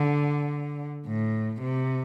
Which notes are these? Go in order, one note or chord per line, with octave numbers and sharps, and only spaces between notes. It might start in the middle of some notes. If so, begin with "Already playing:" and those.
Already playing: D3
A2
C3